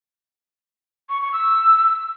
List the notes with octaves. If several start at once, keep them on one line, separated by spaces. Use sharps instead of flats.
C#6
C#6
E6